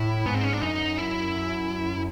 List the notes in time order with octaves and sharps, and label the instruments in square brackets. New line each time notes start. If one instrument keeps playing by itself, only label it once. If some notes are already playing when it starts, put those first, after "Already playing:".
Already playing: [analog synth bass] A2 [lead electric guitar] E4
[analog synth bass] G#2 [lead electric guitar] B3
[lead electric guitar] C4
C#4
D4
[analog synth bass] F#2 [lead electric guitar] D#4
[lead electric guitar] E4